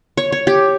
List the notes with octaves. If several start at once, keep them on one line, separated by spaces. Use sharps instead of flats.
C#5
C#5
G4